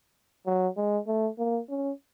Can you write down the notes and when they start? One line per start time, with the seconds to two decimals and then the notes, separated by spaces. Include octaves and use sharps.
0.46 F#3
0.77 G#3
1.07 A3
1.39 A#3
1.70 C#4